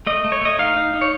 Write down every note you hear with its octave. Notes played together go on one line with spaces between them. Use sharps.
A3 D#5
A3
C#5
A3 D#5
D#4 F5
D#4
D#4
C#5